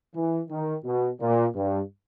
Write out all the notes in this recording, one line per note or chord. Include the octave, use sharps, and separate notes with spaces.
E3
D#3
B2
A#2
G2